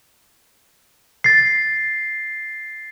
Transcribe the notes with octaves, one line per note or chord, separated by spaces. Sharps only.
A6 C7